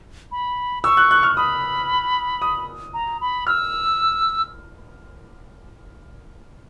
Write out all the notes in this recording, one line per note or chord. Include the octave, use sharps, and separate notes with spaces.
B5
C#6 E6
F#6
F#6
F6
B5 D#6
D#6
A#5
B5
E6 F6